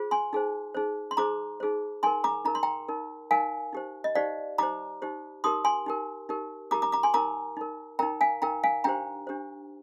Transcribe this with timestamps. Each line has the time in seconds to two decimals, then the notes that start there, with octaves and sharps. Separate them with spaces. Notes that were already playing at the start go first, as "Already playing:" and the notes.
Already playing: F4 G#4 C5
0.11 G#5 C6
0.33 D#4 G#4 C5
0.75 D#4 G#4 C5
1.11 C6
1.17 D#4 G#4 C5 A#5 D6
1.60 D#4 G#4 C5
2.03 D#4 A#4 G#5 C6
2.24 A#5 D6
2.45 D#4 A#4 A#5
2.55 C6
2.63 G5 A#5
2.89 D#4 A#4
3.31 D#4 A#4 F5 G#5
3.73 D#4 G4 C5
4.04 D#5
4.15 D#4 G4 C5 D5 F5
4.58 D#4 G4 C5 A#5 D6
5.02 D#4 G4 C5
5.44 D#4 G4 A#4 C6 D#6
5.65 G#5 C6
5.86 D#4 G4 A#4
6.29 D#4 G4 A#4
6.71 D#4 G4 A#4 A#5 D6
6.82 A#5 D6
6.92 A#5 D6
7.03 G#5 C6
7.14 D#4 A#4 A#5 D6
7.57 D#4 A#4
7.99 D#4 A#4 G5 A#5
8.21 F5 G#5
8.42 D#4 A#4 G5 A#5
8.64 F5 G#5
8.84 D4 G4 C5 G5 A#5
9.27 D4 G4 C5